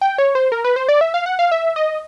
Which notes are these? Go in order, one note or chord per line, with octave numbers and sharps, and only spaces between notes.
G5
C#5
C5
A#4
B4
C5
D5
E5
F5
F#5
F5
E5
D#5